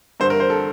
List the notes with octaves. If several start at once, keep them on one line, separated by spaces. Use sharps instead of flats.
G2 D3 C5
A#4
C5
A4